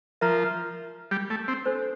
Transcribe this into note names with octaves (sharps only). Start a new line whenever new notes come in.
F3 A#4 E5 A#5
G3
A3
C4
D4 A4 C5